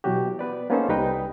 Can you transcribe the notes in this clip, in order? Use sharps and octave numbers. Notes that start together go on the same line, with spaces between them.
B2 E3 F#3 F#4 G4
B3 B4 D5
A#3 B3 C#4 D#4 A4 C5
C2 G3 D#4 B4 G5